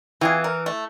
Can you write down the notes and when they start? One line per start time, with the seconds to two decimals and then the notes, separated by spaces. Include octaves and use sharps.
0.21 E3 C4 F4 G#4
0.44 A#4
0.66 A3